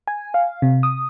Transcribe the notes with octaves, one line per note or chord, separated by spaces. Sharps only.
G#5
F5
C3
D#6